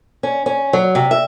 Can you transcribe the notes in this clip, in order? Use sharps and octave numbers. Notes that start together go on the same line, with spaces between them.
C#4
C#4
F#3
C3
E5